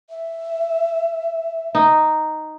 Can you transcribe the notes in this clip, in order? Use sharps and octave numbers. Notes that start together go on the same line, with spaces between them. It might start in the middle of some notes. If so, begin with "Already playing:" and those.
E5
D#4